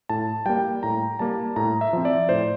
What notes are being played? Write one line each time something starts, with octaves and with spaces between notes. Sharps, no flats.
A2 A5
G3 A#3 G5
A2 A#5
G3 A#3 A5
A2 A#5
E5
F3 C4
D5
A2 C5